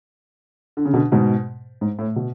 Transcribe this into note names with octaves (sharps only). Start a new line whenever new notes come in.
D3
C#3
B2 D3
G#2 B2
G#2
A2
B2